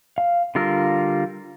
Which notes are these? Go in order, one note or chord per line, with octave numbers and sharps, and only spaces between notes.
F5
D3 G3 F4 A#4 E6